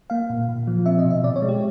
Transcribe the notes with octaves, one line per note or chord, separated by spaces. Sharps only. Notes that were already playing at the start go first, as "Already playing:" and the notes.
A#3 F5
A#2
A#2
F3
C4 E5
D#5
B2
E5
B2 D5
C#5
G#3
G4